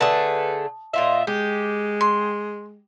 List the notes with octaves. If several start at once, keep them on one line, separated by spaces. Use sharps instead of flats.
D3 A3 G#4 B4 A5 D#6
A#2 F4 D#5 E5
G#3 G4
C6